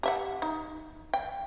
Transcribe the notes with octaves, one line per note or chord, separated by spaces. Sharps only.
G4 E5 F#5
D#4
G5